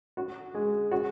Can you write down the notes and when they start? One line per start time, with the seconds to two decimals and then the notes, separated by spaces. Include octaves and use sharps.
0.17 F#4
0.54 G#3
0.91 F#4